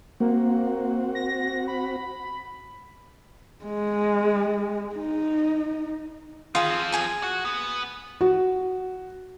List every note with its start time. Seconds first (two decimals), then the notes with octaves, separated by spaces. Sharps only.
0.20 A#3 C4 F#4
1.15 A#6
1.67 B5
3.65 G#3
4.96 D#4
6.55 D#3 F4 G#4
6.70 F3 C4
6.92 G#4 G#5 D#6
7.23 F#4
7.45 B3
8.21 F#4